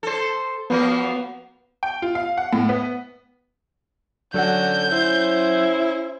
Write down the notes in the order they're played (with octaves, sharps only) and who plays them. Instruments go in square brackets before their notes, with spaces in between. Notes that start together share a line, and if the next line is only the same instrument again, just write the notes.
[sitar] A4 C5
[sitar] F3 F#3 A#4 [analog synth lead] B3
[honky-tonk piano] G5
F4
F5
F#5
A2
B3
[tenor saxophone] D3 [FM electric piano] F#3 F#5 [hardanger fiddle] C#4 F#4 [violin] G6
[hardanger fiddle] C#4 C5 [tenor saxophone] E4